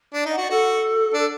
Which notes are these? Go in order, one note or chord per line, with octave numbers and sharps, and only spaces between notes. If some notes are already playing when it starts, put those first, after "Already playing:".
D4
D#4 D#5
F#5
F#4
D5
F#4 A4
D4 A4